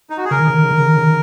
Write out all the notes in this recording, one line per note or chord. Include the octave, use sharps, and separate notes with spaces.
D#4
F#4
G#4
C#3 A#4
D#3
C#3
D#3
C#3
D#3
C#3
D#3
C#3
D#3